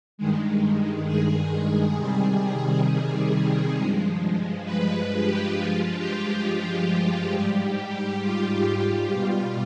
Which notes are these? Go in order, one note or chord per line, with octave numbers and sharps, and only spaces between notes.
G2 D#3 G#3
G#4
C3 D#3 G3
G2 F3 G#3
B4
G4
G2 F3 G#3 F4
G4
G4
F4
G#2 G3 G4
F4
B2 G3 F4